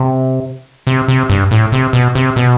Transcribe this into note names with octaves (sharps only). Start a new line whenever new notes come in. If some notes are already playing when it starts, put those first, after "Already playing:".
Already playing: C3
C3
C3
G2
A2
C3
B2
C3
B2